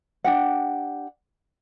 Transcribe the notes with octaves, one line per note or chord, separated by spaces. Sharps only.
D4 G4 F#5